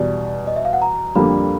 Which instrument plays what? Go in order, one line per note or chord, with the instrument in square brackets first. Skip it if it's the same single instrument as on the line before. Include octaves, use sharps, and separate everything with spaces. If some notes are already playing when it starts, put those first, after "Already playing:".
Already playing: [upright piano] E2 B2 G3 [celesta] D5
[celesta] D#5
E5
F5
F#5
A#5
[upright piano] F2 D3 G3 A#3 [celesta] B5